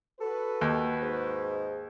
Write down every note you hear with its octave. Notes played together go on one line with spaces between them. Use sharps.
F#4 A4 B4
D#2
G#2